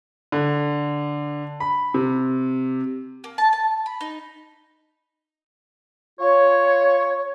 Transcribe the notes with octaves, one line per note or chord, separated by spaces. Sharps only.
D3
B5
C3
A#3
A5
A5
B5
D#4
F4 C#5